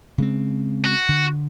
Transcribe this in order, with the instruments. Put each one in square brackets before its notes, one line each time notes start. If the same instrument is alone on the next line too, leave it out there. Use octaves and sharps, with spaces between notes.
[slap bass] C#3 G#3 C4
[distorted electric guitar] F#4
[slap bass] D3